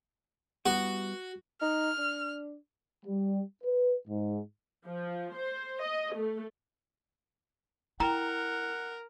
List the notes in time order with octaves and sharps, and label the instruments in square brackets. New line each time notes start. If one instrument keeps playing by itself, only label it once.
[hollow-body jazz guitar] G3 B3 E4 [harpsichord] F#4
[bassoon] D#4 [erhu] F6
[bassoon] D4
[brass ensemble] G3
B4
G#2
[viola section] F3
C5
D#5
A3
[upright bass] E4 [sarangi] A#4 [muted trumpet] F#5 [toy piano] G5 A#5